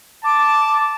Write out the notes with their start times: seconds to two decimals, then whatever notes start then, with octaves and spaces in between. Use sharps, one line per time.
0.25 A5 D6